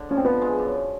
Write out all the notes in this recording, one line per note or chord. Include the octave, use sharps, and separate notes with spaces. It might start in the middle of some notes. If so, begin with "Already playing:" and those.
Already playing: D3
F3 C#4
C4
F3 B3
G#3
F#2